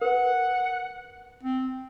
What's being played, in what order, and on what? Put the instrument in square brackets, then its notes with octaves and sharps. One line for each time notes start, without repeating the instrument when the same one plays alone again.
[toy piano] A#4 B4 [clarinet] F#5
[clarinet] C4